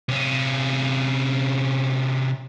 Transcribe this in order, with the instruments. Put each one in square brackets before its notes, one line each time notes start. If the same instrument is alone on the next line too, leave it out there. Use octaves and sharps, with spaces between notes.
[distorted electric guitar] C3 C#4